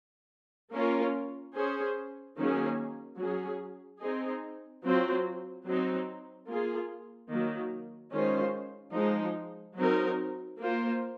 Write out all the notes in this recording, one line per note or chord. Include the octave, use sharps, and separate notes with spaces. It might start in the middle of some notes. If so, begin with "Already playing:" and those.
A#3 C#4 F4 A#4
C#4 G#4 C5
D#3 F#3 A#3 C#4 G#4
F#3 C#4 G#4
C4 D#4 G#4
F#3 C4 F4 C5
F#3 C4 D#4
A#3 F4 G#4
D#3 F#3 A#3
D#3 G#3 C#4 F4 C5
F3 G#3 D#4
F#3 C4 D#4 A#4
A#3 F4 C5